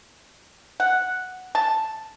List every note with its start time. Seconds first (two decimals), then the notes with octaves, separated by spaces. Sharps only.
0.80 F#5
1.55 A5